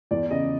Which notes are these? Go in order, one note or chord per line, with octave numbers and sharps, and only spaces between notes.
E2 D5
C#3 D#5